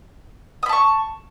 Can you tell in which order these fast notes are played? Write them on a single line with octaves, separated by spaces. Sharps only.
D#6 B5 A5 C#6